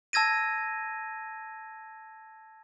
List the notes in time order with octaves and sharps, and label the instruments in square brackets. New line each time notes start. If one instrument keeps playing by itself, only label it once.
[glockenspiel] A5 E6 G#6 A#6 D#7